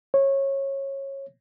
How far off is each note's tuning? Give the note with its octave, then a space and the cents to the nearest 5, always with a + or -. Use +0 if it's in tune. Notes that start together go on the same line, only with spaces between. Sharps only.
C#5 -20